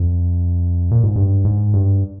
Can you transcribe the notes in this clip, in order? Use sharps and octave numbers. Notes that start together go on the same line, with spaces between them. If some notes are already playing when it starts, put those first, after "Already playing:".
Already playing: F2
A#2
G#2
G2
G#2
G2